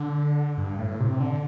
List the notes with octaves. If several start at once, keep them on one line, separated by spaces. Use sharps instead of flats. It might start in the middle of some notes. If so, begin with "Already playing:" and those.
Already playing: D3
G2
A2
C3
D3